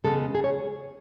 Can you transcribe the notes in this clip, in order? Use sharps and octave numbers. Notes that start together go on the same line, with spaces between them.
E2 C#3 G#3 B3 A4
G#4
C#5